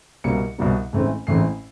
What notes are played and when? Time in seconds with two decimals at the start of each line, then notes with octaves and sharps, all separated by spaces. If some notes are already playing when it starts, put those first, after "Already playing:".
0.24 C2 B2 G3 A#3 C#7
0.58 C2 B2 G3 A#3
0.93 A1 G#2 E3 A3 C4
1.27 A1 G#2 E3 A3 C4 C7